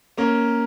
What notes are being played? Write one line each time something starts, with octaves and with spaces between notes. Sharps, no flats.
A#3 C#4